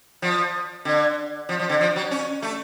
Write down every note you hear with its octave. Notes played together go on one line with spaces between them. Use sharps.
F3
D3
F3
F3
D3
F3
F#3
C#4
A3